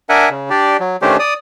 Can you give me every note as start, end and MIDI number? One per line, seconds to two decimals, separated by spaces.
0.09 0.29 62
0.09 0.29 70
0.09 0.29 76
0.09 0.29 78
0.09 0.29 80
0.30 0.50 49
0.50 0.77 62
0.50 0.77 67
0.50 0.77 74
0.80 0.97 54
1.02 1.17 51
1.02 1.17 57
1.02 1.17 61
1.02 1.17 62
1.02 1.17 67
1.02 1.17 72
1.19 1.34 74
1.19 1.34 87